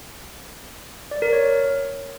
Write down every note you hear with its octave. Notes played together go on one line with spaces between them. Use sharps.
D5
A#4
C#5